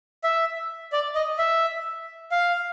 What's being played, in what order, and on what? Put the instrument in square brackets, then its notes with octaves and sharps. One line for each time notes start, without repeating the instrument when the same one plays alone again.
[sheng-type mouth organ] E5
D5
D#5
E5
F5